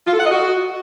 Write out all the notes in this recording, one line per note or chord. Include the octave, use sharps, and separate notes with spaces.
F4
A4
F#5
D#5
F#4